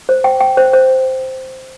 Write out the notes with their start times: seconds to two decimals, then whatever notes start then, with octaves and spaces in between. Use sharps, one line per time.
0.09 C5
0.24 G5
0.41 G5
0.57 C5
0.73 C5